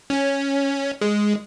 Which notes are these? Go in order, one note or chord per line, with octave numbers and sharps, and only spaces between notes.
C#4
G#3